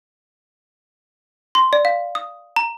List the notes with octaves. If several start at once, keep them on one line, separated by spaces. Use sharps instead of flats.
C6
D5
F5
D#6
A#5